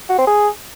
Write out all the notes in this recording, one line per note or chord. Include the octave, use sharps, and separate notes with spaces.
F#4
C4
G#4